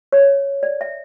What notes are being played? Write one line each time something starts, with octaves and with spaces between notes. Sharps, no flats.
C#5
D5
E5